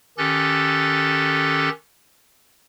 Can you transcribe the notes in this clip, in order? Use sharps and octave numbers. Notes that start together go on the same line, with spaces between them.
D#3 C#4 G4 A4 F#6 A6